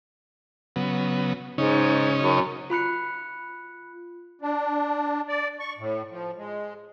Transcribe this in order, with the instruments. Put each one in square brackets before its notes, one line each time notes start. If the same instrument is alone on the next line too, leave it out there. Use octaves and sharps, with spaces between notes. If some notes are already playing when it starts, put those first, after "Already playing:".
[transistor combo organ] C#3 F#3 B3
[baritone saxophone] G#2 [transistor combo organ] C#3 C#4 D#4
[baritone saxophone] F#2
[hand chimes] F4 B5 F#6 C#7
[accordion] D4
D5
C#6
A2
F3
G#3